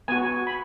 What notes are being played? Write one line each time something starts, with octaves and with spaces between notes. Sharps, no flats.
B3 F#4 G#5
B5